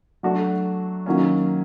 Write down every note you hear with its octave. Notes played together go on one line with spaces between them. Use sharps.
F#3 A3 D4 F#4
D#3 F#3 A#3 C#4